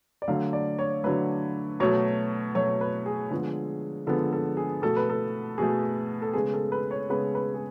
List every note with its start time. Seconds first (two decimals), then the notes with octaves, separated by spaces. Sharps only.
0.22 D5
0.28 D3 F#3 A3 F5
0.53 D5
0.79 C#5
1.04 D3 F#3 A3 B4
1.80 B2 F#3 A3 C#5
2.55 B2 F#3 A3 C#5
2.81 B4
3.06 G#4
3.31 D3 F3 G#3 B3
4.07 D3 F3 G#3 B3 A4
4.33 A4
4.57 G#4
4.82 B2 A3 A4
4.97 B4
5.10 A4
5.58 B2 A3 G#4
6.22 A4
6.33 C#3 G#3 B3 G#4
6.54 A4
6.72 B4
6.91 C#5
7.10 C#3 G#3 B3 B4
7.35 B4
7.54 G#4